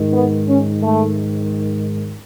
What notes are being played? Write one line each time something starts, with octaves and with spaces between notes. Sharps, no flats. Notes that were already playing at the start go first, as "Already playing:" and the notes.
Already playing: G#2 D#3
B3
C#4
A3